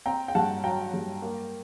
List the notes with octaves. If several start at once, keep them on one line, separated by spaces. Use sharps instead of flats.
C4 G5 A#5
G5
G2 F#5 A5
F#3 G5 A#5
G2
A#3